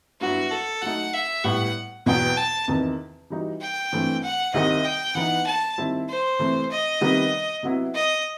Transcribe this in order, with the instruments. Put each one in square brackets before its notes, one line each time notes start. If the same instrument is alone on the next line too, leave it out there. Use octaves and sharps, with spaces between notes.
[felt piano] G2 F#3 B3 E4 [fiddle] F#4
[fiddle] A4
[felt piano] F#3 A3 D#4 [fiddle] F#5
[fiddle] E5
[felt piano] A2 G3 B3 [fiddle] F#5
[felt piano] E2 B2 F#3 B3 [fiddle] G5
[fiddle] A5
[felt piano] E2 C3 D#3
E3 G3 D#4 F#4
[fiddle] G5
[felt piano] G2 E3 A3 C4
[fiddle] F#5
[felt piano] C2 C3 D#3 G3 C4 [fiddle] D#5
[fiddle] G5
[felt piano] E3 B3 D#4 [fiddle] F#5
[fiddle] A5
[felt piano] D#3 G3 C4 E4
[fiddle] C5
[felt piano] C3 E3 A3
[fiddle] D#5
[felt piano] C3 D#3 G3 B3
C3 F#3 B3 E4
[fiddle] D#5